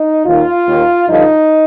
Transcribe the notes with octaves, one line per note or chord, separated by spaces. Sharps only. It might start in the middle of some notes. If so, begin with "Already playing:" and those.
Already playing: D#4
D#2 D#3 F4
D#2 D#3
G2 D3 F3 D#4